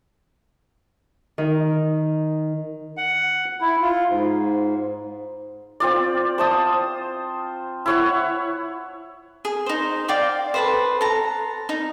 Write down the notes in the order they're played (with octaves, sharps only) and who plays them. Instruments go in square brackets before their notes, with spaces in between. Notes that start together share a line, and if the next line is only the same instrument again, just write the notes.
[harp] D#3
[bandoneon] F#5
E4
F4
G#2
[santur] C4 F4 D5
C5 A5 D#6
E4 C#5 F#5
[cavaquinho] G#4
D#4 C5
D5 F5 G5 D6
A4 B4 C5
A4 A#5
D#4